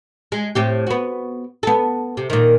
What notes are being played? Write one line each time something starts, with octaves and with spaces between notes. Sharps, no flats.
G#3
A2 C4 G4
B3 F#4
B3 A4
C3
A#2 D#3